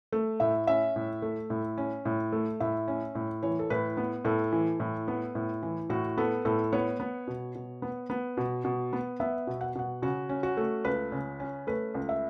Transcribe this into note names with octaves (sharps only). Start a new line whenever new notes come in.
A3
A2 E5
C#4 E5
A2
A3
A2
C#4
A2
A3
A2 E5
C#4
A2
E3 C#5
A4
A2 B4
B3
A2 A4
E3
A2
B3
A2
E3
A2 F#4
B3 A4
A2 A4
B3 C#5
B3
B2
B2
B3
B3
B2
B2
B3
B3 E5
B2
F#5
B2 F#5
C#3 F#4
C#4
F#4
A3
C#2 B4
C#3
C#4
A3 B4
C#2
E5